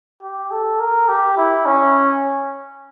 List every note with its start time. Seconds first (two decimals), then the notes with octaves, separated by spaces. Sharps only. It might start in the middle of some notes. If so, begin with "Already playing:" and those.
0.23 G4
0.51 A4
0.80 A#4
1.09 G4
1.37 E4
1.66 C#4